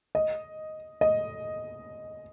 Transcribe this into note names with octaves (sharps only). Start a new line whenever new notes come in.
D#5
D#5